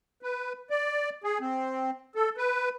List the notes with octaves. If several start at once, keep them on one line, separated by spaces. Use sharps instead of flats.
B4
D5
G#4
C4
A4
B4